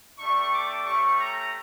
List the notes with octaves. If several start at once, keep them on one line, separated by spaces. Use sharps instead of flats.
A3 D4 G4 C#6
D6
A3 C#4 G4 C#6
A#5